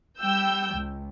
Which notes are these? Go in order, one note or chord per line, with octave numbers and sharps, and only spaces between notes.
G3 G5 E6 G6
C#2